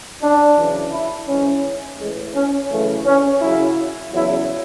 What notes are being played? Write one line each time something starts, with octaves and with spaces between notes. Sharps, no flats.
D4
F#2 C#3 E3
E4
G#2 E3 C#4
A2 E3 G#3
C#4
F#2 C#3 E3 A3
C#4
F#2 C#3 F#3 E4
E2 C#3 F#3 E4